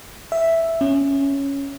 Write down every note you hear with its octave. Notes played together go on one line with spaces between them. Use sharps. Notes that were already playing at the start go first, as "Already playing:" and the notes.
E5
C#4